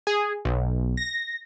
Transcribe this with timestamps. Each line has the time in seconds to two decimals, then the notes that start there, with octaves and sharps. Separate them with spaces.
0.07 G#4
0.45 B1
0.97 A#6